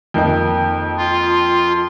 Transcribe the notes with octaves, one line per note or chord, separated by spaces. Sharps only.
F2 D#3 A#3 D#4
F4